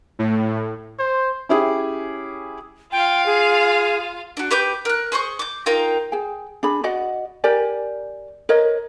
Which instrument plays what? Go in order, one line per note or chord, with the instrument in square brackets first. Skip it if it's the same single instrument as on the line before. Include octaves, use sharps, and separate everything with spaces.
[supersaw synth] A2
[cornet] C5
[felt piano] C#4 E4 G4 G#4
[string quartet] F4 F5 [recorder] G5
[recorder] G#4
[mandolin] D4 F#4
G4 B4 D6 G6
A#4 F#6
G#4 C5 C6 C#6
D6 G6
D#4 F4 A#4 G5
[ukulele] G#4 G5
D4 G#4 B5
F#4 D5 D#5 F#5
G4 A#4 D5 G#5
A#4 B4 C#5 D#5